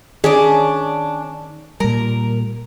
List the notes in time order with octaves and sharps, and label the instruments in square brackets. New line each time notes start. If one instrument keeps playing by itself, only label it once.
[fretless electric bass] D#3 [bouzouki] C#4 D4 D5 [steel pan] G#4
[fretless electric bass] A#2 G3 [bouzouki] A#4